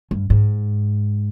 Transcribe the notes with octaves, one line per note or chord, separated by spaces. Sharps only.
G2
G#2